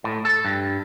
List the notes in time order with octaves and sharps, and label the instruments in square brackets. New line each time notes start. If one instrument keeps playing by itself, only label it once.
[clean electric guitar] A2
A4
G2